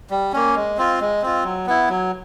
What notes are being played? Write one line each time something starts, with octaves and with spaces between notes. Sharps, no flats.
G3
A#3 C#4
G#3
C4 F4
G#3
C4 F4
F#3
B3 E4
F#3